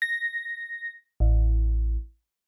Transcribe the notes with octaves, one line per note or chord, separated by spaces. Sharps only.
A#6
A1